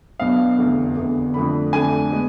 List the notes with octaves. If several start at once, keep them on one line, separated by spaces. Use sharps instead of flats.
B1 B2 B3 D4 F5
F1 E2 D3
F1 E2 D3
F2 D3 A3 D4 B5
F2 D3 A3 D4 G#5
G#3 B3